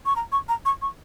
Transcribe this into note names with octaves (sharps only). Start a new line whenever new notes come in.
C#6
A#5
C#6
A#5
C#6
C#6